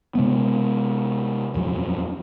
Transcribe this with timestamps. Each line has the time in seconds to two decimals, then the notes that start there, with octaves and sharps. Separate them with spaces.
0.15 C3 G#3 B3
1.54 D#1 F2 F#3